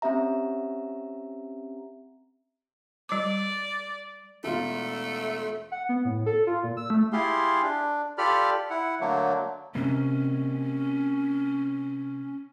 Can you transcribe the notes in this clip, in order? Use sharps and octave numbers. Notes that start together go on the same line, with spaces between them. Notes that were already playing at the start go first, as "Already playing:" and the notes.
C4 C#4 G4 E5 A#5
G3 D5 D6
E1 A3 F4
F#5
B3
A2
A4
F4
A#2
E6
A3
E4 F4 G4 G#4 F5 C6
D4
F4 G4 A4 D5 B5 F6
E4 F#5
D3 F#3 A3 A#3
C3 A#3 C#4